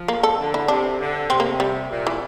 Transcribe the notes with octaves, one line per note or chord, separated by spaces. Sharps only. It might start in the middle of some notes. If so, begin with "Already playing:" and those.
Already playing: F3
A#3
A4
D3
E4
C3 D4
D3
C3 C4
A#3
G3
A#2
E3